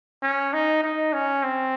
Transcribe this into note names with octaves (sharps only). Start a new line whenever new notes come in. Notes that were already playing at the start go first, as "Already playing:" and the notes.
C#4
D#4
D#4
C#4
C4